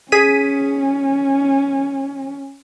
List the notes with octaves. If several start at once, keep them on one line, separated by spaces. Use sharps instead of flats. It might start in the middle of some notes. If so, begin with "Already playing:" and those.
C#4 G#4 B6 D#7